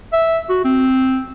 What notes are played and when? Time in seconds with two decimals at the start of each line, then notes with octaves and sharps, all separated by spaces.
0.13 E5
0.50 F#4
0.65 C4